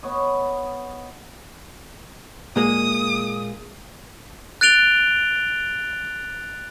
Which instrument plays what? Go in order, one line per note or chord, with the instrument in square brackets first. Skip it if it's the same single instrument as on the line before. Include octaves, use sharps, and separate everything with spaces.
[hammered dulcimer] B3 C#5 D#5
[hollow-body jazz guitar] A#2 G#3 A#3 [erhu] D#6
[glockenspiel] F#6 A6 D7 F7 G7